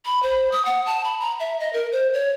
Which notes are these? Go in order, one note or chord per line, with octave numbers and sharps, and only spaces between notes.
B5
C5
D#6
F#5
A5
B5
A#5
E5
D#5
A#4
C5
C#5